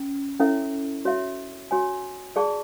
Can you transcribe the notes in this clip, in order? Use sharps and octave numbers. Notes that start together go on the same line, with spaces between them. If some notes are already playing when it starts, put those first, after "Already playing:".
Already playing: C#4
C#4 E4 A4 C#5 E5
F#4 C#5 E5
F#4 C#5 G#5
G#4 D5 A5 C#6